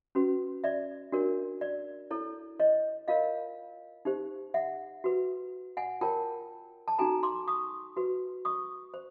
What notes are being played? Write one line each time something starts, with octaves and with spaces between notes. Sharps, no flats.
C#4 F#4 B4
D5 E5
D4 F#4 A#4 C#5
D5
E4 A4 C#5
C#5 D#5
F4 A#4 C#5 D#5 F5
D#4 G4 C5
E5 F#5
F#4 B4
F#5 G#5
F4 A#4 C#5 G5 A5
A5
D#4 F#4 A4 G#5 A#5
C6 D6
C#6 D#6
F#4 B4
C#6 D#6
C5